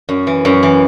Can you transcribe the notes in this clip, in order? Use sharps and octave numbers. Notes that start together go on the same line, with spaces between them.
F#2
E3
F#2
E3